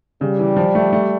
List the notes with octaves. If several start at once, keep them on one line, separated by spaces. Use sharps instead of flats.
C#3 G3
E3
F3
A3
A3